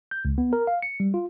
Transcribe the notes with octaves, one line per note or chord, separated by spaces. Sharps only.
G6
C#2
B3
A#4
F5
C#7
G3
F4